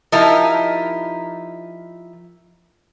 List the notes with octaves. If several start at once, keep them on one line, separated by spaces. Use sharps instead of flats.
F3 D#4 E4 G4 A#4